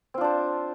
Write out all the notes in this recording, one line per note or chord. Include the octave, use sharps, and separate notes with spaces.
C4 D4 F4 C5